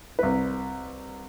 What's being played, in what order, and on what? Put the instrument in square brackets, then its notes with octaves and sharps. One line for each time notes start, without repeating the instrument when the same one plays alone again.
[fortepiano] C2 B4